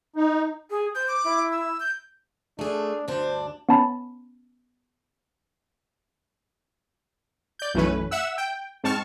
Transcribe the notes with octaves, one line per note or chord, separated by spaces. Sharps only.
D#4
G#4
C5 G6
D6
E4
E6
G6
A3 D4 G#4
D2 G2 D4 C5
B3 C#4 A5 B5
D5 G6
B1 F#2 E3 A3 C#4 B4
E5 F#5 E6
G5
G#2 C4 A5 C#6 F6